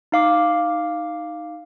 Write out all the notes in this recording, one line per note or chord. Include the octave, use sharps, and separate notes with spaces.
D#4 F5 D6